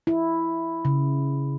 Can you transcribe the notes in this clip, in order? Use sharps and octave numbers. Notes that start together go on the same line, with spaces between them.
E4
C#3